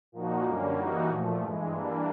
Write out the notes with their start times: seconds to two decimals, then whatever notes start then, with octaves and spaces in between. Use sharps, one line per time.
0.12 A#2 F3 A#3 D#4 F#4
0.44 F#2 D3 G3 A#3 C#4
0.76 E3 G3 A#3 D#4 F#4
1.08 A#2 F3 A3
1.40 G2 E3 G#3
1.72 E3 G3 A#3 D4